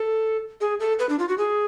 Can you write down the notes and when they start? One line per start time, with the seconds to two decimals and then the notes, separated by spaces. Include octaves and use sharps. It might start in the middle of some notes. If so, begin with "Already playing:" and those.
Already playing: A4
0.61 G#4
0.80 A4
0.99 B4
1.09 D4
1.19 F4
1.29 F#4
1.38 G#4